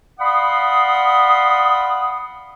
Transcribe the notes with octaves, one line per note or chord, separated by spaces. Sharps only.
D5 F5 F#5 B5 C6 D#6